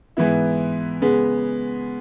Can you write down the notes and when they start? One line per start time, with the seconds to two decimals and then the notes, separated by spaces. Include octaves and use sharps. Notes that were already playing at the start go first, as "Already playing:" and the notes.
0.17 G#2 E3 B3 E4
1.01 C#3 G#3 B3